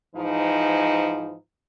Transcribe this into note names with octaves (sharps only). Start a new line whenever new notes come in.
G#2 E3 F3 D#4